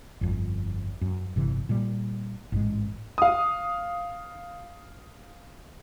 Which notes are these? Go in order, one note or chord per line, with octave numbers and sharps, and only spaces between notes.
G1 F2
F#2
G1 C3 E3
A#2 G3
A1 G#2 G#3
F5 D#6